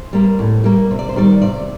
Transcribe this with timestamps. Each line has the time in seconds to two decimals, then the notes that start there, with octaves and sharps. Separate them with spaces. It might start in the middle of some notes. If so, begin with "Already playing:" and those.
Already playing: C5
0.13 G3 A#3
0.39 A2
0.64 G3 A#3
0.91 C3
0.99 D5
1.09 C5
1.16 D#3 G3 D5
1.41 C3 D5